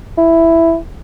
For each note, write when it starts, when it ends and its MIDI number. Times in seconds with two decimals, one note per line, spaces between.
0.17 0.76 64